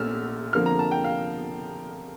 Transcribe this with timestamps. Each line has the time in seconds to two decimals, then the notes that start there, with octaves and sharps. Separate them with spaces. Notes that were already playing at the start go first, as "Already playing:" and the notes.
Already playing: A#1 A#2 A3 C#4 E6 F6
0.53 F2 D3 F3 A#3 F6
0.66 A#5
0.79 A5
0.91 G5
1.04 F5